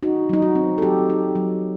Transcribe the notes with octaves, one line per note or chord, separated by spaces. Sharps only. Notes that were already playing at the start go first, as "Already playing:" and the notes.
D#4 F#4
F#3 D#4
F#4
C4
A4
F#3 G4
D#4
F#3